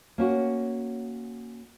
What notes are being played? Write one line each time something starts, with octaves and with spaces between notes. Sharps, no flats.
A#3 C#4 F#4